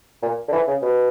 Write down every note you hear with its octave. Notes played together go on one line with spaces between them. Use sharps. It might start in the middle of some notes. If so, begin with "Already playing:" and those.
A#2
D3
E3
C#3
B2